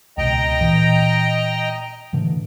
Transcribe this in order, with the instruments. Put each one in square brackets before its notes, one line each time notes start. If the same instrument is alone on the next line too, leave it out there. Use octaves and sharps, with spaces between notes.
[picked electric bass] C#2 B2 [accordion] D#5 G5 A#5
[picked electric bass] A#2 E3
A2 D3 E3